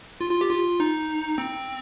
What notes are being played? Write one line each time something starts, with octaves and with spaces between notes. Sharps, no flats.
F4
F4
G4
F4
D#4
C4